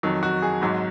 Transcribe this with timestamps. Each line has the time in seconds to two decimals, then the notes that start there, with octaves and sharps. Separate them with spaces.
0.03 F2 D#3 F#3
0.23 F#4
0.42 G#4
0.61 G#1 G#2 F#3